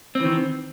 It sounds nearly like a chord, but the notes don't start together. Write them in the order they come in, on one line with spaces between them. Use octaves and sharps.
C4 E3 D#3